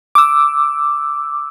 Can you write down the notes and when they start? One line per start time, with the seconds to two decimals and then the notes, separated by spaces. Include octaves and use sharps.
0.15 D6 E6